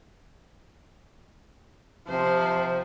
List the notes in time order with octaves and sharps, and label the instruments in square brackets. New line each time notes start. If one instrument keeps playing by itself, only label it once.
[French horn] C3 [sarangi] F3 [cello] C5